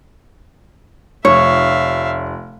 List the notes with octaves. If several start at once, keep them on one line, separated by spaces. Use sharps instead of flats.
F1 C#5 E5 F5